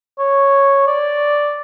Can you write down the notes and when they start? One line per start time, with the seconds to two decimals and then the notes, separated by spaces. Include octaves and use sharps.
0.19 C#5
0.87 D5